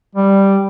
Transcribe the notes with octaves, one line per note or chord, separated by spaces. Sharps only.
G3